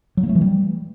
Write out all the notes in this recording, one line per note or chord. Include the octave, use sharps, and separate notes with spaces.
F#3
A#3
A3
E3
G3